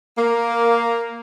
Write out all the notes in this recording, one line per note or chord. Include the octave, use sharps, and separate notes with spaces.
A#3